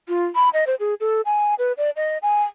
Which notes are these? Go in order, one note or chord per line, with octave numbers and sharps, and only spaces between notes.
F4
B5
D#5
C5
G#4
A4
G#5
B4
D5
D#5
G#5